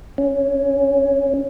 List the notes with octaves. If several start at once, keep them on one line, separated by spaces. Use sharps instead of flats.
C#4